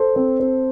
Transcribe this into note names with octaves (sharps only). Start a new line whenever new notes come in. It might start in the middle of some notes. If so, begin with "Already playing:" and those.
Already playing: A4 C5
C4
C4